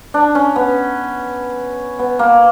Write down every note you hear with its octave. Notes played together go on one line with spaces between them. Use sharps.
D4
C#4
B3
B3
A#3